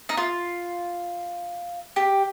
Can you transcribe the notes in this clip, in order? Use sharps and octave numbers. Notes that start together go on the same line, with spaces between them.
D#4
F4
G4